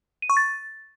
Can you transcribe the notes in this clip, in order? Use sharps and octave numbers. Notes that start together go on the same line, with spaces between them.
D#7
C#6
A6